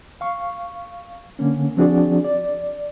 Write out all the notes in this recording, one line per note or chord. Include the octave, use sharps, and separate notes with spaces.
F5 C#6
D3 A#3 C#4
F3 C4 D4 F#4 G#4 D5
D5